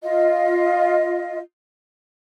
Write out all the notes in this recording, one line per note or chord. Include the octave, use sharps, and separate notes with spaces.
F4 D#5